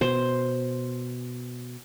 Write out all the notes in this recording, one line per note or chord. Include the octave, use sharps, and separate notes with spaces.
B2 C5